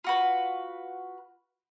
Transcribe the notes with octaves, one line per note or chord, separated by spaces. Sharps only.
F4 F#4 B4